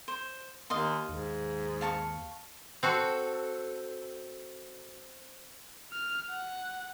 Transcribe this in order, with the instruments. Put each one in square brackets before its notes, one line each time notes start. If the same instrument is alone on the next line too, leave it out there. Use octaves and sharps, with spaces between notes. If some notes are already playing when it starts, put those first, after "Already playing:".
[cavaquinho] C5
[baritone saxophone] D#2 [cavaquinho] D#5 F5 C6
[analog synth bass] D#2 [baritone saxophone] G#2
[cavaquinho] F5 A5 C#6
[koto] C4 F#4 A4
[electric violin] F6
F#5